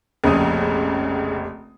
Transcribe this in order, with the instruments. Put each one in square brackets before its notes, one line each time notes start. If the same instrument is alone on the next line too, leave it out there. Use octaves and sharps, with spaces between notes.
[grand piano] F1 A#1 D#6 [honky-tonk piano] C#3